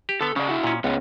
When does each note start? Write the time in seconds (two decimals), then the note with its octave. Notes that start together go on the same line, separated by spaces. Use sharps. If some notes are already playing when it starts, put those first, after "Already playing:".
0.09 G4
0.21 D3 B3 A4
0.36 C#3 C#4 G#4 D5
0.47 E4 F#4
0.64 A#2 C#4
0.84 C#2 B3 C#4